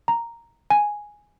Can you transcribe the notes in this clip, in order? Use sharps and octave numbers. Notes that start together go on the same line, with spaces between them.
A#5
G#5